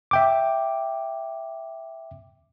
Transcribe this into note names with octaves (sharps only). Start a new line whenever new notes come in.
E5 G5 D6